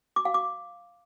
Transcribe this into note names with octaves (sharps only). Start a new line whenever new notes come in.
D6
F5
D6